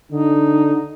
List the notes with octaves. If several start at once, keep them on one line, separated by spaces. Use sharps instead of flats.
D3 D#4